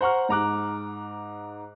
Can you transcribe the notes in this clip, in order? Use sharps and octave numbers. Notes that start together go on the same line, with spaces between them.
C5 F#5 A#5 C#6 F6
G#2 A#5 D6 F#6